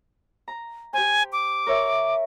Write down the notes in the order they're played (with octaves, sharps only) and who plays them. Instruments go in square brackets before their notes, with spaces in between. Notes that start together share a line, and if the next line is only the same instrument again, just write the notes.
[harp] A#5
[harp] G4 C5 [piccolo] G#5
[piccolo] D6
[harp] A#4 C#5 E5